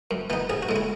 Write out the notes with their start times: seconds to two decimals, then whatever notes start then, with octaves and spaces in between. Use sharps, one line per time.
0.11 F#2
0.30 E3 B3 D#4
0.50 A1 G#4
0.63 F#4
0.69 A2 G#3
0.76 E4